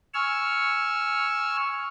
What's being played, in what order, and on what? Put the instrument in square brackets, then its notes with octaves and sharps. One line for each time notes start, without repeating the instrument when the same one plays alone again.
[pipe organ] G#5 C#6 E6 F6